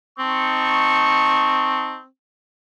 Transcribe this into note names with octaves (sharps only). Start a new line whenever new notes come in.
C4 D#4 A5 C#6